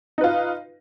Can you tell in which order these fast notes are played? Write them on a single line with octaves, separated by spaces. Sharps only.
D#4 B4 F4